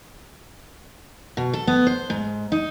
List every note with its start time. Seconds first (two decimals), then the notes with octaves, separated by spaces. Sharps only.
1.37 B2
1.53 A4
1.67 B3
1.87 C5
2.10 G#2
2.52 D#4